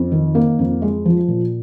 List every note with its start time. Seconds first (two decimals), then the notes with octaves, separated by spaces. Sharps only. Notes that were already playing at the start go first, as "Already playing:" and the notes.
Already playing: F2
0.12 D#3
0.35 A#3
0.59 F2
0.82 G#3
1.05 F3
1.28 A#2